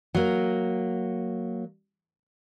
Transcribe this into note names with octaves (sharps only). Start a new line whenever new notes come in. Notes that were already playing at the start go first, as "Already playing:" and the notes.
F#3 A#3